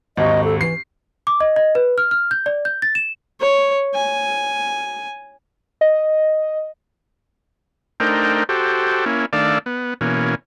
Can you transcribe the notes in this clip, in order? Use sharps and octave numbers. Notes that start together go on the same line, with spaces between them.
G#1 D#2 D#5
A4
E3 C7
D6
D#5
D#5
B4
F6
F6
G6
D5
G6
A6
E7
C#5
G#5
D#5
A3 D4 D#4 A#4 C5 G5
F#4 G4 A4 C5
A#3 C#4 E4
D#3 A3 D4 D5 F5 E6
B3
B2 E3 A#3 C#4